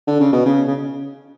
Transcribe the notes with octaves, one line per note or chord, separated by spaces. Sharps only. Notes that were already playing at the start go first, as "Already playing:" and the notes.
D3
C#3
B2
C#3
C#3